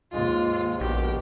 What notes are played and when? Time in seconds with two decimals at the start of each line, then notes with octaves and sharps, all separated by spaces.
0.13 D#2 G#2 G#3 F4
0.81 A#1 B2 D#3 G4